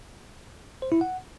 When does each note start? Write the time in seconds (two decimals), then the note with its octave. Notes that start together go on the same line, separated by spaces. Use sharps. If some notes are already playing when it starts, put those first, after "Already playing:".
0.82 C5
0.92 E4
1.01 F#5